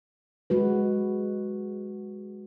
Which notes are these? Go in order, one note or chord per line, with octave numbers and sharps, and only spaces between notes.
G#3 F#4 B4